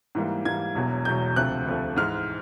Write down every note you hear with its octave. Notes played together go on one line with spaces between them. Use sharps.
G#2 E3 G3 A#3
G#2 E3 G3 A#3 G#6
E1 E2 B2 F#3
E1 E2 B2 F#3 G6
D2 C3 F3 A3 F#6
D2 C3 F3 A3
G#2 E3 G#3 F6